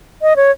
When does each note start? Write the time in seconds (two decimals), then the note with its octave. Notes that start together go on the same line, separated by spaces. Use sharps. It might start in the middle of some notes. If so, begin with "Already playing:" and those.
0.22 D#5
0.36 C#5